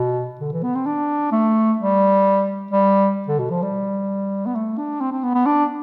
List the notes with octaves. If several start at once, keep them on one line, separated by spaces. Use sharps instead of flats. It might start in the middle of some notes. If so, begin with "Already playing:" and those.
Already playing: B2
D3
E3
B3
C4
D4
A3
G3
G3
D3
B2
F3
G3
B3
A3
D4
C4
C4
B3
B3
D4